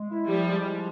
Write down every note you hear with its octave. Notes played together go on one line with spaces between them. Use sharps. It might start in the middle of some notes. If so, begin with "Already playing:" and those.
Already playing: G#3
E4
F3 G3
G#3
F3